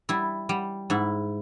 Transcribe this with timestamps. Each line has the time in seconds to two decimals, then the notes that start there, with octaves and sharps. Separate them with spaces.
0.09 G3 E4
0.49 G3
0.90 G#2 E4